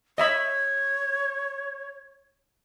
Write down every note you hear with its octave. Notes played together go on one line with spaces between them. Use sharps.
C#5 D#5 E5 B5